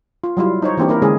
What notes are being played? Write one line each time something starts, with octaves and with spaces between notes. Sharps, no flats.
F4
F#3 G3 E4 F4
D#4 C5 C#5
E3 A#3 C4 D4 G4
A#3 E4 A#4
D3 G#3 C#4 G#4